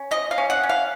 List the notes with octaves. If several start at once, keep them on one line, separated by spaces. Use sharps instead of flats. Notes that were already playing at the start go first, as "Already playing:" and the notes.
Already playing: C#4
F3 D#5
F5
C#4
F#5
C#4
F5